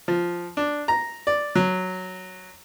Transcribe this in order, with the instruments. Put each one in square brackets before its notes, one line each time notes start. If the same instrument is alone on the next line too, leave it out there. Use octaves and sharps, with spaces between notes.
[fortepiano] F3
D4
A#5
D5
F#3